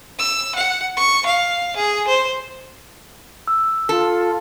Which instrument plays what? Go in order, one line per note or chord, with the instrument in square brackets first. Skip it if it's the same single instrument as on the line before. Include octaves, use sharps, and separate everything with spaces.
[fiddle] E6
F#5
C#6
F5
G#4
C5
[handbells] E6
[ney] F4 [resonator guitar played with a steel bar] A4